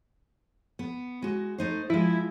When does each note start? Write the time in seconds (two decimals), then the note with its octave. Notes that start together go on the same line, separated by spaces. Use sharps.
0.79 B3
1.22 G#3 F#4
1.58 A3 D#4 C5
1.90 F3 G#3 E4